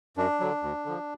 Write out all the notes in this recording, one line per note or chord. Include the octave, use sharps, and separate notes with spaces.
F#2 D4
D3 F#3
D2
D3 F3